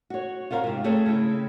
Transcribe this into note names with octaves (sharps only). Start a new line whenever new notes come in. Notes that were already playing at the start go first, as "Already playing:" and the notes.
F#4 C#5
F4 F#4 A#4 C5 F5
G#2 C3
A3 C4 G#4 C#5 G5
C#3 E4